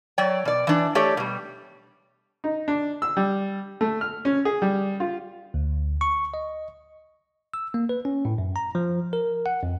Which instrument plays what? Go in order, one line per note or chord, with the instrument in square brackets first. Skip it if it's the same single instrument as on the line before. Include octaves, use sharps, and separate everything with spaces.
[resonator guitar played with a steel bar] F#3 C#5 D5 G5
B2 D5
E3 D4
A3 G4 A4 C#5 D5
B2 G3
[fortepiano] D#4
D4
E6
G3
A3
F6
C#4
G#4
G3
F4
[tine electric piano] D2
C#6
D#5
E6
A#3
B4
C#4
A2
F#2
A#5
F3
A#4
F#5
F2